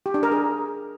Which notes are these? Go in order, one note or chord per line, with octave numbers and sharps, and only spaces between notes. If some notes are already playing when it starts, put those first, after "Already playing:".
G4
D4
A#4
G#4